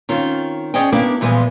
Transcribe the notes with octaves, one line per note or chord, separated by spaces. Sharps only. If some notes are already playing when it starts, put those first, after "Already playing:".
D#3 C4 C#4 F4
C#4 G#4 C5 D5 D#5 G5
A#3 B3 D4 E4 G4 A#4
A#2 E3 F3 G3 G#3 B3